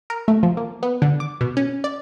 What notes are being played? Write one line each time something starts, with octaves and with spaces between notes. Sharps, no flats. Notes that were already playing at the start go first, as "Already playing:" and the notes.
A#4
A3
F3
A#3
B3
D3
D6
B2
C#4
D5